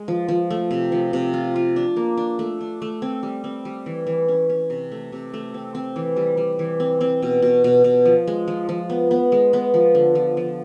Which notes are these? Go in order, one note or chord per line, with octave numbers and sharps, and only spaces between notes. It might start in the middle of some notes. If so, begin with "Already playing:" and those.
Already playing: G#3
F3
F3
A3
C3
F3
C3
F4
F4
D4
A#3
D4
A3
D4
A3
C4
G3
C4
G3
E3
E3
C#4
C#4
C3
A3
C3
A3
C4
C4
E3
G3
G3
E3
C4
C4
B2
B2
B2
B2
F3
G#3
F3
F3
B3
B3
G#3
B3
F3
D3
F3
F3